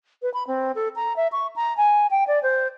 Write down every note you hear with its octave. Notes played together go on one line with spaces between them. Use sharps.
B4
B5
C4
A4
A#5
E5
C#6
A#5
G#5
G5
D5
C5